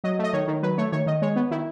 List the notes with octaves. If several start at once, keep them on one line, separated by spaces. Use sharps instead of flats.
F#3 D#5
A3 D#5
D#3 C#5
D#3
F#3 B4
A3 C#5
D#3 C#5
D#3 D#5
G#3 C#5
B3
D#3 E4